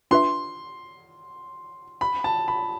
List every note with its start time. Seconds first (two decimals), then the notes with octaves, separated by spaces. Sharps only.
0.11 D4 F4 B4 E5 C6
2.01 B5
2.24 A5
2.48 B5